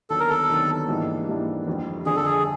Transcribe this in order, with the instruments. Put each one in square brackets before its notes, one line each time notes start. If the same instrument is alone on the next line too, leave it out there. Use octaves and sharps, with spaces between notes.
[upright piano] D#2 D3 F#3 B3 [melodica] A4
[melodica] A#4
A4
[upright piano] D#2 D3 F#3 B3
G#2 E3 G3 A#3 D4
G#2 E3 G3 A#3 D4
G1 F2 D3 G3 C4
[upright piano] G1 F2 D3 G3 C4 [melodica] G#4
[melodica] A4
G#4